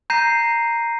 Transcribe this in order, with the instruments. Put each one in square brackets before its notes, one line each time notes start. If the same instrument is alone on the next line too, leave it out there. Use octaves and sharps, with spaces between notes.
[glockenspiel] A#5 G6 A#6 C7 D#7